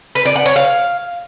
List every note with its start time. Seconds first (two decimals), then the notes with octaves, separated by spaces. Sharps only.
0.15 B4
0.25 D5
0.36 F#5
0.46 C#5
0.56 F5